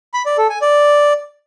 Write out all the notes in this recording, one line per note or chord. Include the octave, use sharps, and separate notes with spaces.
B5
D5
A4
G#5
D5